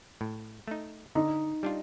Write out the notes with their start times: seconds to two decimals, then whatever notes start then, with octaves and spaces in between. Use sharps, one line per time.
0.21 A2
0.68 A3 D#4
1.15 D3 D#4
1.63 G3 D4 F4